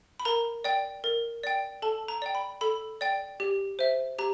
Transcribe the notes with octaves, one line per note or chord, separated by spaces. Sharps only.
B5
A#4 A#5
D5 G5
A#4
D5 G5
A4 A5
A#5
D5 G5
B5
A4 B5
D5 G5
G4
C5 E5
G4 A#5